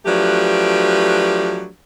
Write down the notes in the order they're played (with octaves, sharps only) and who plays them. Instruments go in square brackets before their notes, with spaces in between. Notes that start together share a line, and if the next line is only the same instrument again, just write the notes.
[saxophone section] F3 F#3 A3 D4 G4 B4